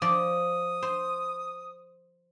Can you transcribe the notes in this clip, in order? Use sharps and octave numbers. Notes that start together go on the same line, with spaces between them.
F3 D5 D#6
C5